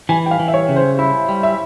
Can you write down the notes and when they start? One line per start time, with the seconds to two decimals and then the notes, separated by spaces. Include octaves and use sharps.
0.09 E3 G#5
0.26 G5
0.31 F5
0.39 E3
0.48 E5
0.54 C#5
0.69 C#3
0.76 C5
0.99 E4 E5
1.29 G3
1.43 E5